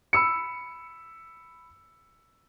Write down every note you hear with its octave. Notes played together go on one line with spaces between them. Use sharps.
B5 E6 C#7